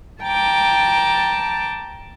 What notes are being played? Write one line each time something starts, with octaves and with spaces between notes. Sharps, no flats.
G5 A5 A#5 D6